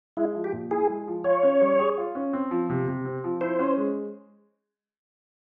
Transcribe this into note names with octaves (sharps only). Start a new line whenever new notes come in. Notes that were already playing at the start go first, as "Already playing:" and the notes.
G#3 E4
F3
G4
A#2
E4 G#4
G#3
F3
F4 C#5
C#4
G3
G#4
F4
C#4
C4
F3
C3
C3
C4
F3
E4 C5
C#4
G#3